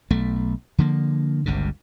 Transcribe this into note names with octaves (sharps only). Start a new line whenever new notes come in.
B1 A3
D3 F3 A#3
G1 C#2 G2 C#3